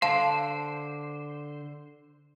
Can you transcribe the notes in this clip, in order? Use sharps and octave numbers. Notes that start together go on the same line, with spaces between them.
D3 C5 F5 A5